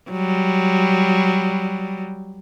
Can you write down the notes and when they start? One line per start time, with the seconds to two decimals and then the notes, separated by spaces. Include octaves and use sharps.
0.11 F#3 G3